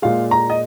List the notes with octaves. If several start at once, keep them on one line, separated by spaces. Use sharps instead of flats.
A#2 G#3 F5
A#5
D#5